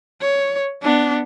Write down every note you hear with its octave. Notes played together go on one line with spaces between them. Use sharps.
C#5
B3 D4